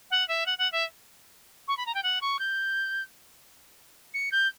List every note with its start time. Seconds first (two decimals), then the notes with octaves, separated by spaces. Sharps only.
0.11 F#5
0.28 E5
0.46 F#5
0.58 F#5
0.72 E5
1.68 C#6
1.77 B5
1.86 A#5
1.94 G5
2.03 F#5
2.21 C#6
2.39 G6
4.14 C#7
4.32 G6